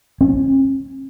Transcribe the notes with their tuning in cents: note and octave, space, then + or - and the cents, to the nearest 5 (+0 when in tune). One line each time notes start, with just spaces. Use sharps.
C#4 -45